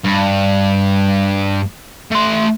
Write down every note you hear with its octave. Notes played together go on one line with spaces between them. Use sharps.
G2
A3 C6